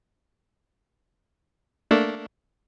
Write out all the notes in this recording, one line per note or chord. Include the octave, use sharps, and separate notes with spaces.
A3 A#3 D4